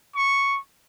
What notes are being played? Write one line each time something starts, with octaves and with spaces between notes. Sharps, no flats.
C#6